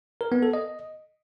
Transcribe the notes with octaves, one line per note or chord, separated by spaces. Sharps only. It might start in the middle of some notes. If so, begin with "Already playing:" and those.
A#4
B3
A4
D#5